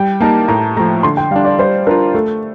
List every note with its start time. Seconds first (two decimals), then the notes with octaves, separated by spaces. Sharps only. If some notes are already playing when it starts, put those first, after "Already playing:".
Already playing: G3 G5
0.20 A#3 D#4 G4 A#4 A5
0.48 A2 A#5
0.77 F3 A3 A#5
1.03 D3 C6
1.17 G5
1.31 G3 D4 F5
1.45 D5
1.59 G3 C5
1.87 D4 F4 A#4
2.15 A3 A4